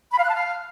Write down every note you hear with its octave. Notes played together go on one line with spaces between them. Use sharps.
B5
F5
F#6
A5
F5